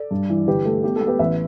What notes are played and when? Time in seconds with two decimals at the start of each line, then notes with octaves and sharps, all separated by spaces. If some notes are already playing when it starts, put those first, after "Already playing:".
Already playing: A4 D5
0.11 G2
0.30 E3
0.47 G1 G4 B4
0.65 A3 A4
0.83 B3 G4
0.96 A4
1.01 B3
1.07 G4 B4
1.19 A1 B4 E5